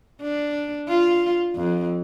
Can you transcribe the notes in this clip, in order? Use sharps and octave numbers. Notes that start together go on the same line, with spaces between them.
D4
F4
F2